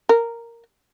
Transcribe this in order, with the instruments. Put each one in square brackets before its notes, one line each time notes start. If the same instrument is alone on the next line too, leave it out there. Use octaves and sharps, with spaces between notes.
[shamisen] A#4